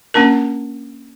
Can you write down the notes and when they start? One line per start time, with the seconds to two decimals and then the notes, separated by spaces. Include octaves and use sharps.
0.14 A#3 C#4 D4 A#4